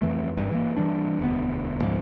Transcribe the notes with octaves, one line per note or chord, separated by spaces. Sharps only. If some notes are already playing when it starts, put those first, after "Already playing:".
F2 E3 A3
G#1 G2
E3 A#3
E3 G3 D4
E1 D2 B3
C#2 G#2 F3 G#3